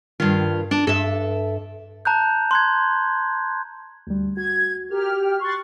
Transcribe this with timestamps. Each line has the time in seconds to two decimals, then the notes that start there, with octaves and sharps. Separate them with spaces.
0.20 G2 D#3 F4
0.71 D4
0.87 G2 A4 E5
2.05 A5 A#5 F#6 G6
2.51 C6 F#6 G#6
4.07 D2 G3
4.37 F#4 G#6
4.91 G4 A#4 F6
5.21 G5
5.40 C6 C#6 F#6 A6